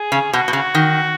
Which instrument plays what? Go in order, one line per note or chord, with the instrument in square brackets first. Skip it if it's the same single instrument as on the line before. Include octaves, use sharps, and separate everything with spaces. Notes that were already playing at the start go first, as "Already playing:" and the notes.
Already playing: [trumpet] G#4
[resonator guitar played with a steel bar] C#3
[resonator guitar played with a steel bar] B2 [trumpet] F#4
[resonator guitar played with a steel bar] B2
C#3
D#3